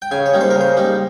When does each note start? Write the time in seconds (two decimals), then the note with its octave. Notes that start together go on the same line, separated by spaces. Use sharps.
0.02 G5
0.11 C#3 G#5
0.26 C#5
0.33 G3 A#3 D#4
0.41 C5
0.51 C#3 A#4
0.61 C5
0.77 G3 A#3 D#4